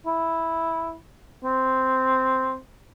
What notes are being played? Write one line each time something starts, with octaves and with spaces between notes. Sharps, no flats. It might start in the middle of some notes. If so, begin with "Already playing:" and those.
E4
C4